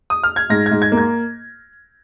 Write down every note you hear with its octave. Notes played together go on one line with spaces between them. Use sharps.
D#6
F6
G#6
G#2 A#6
G#6
G#2
G#6
A#3
G#6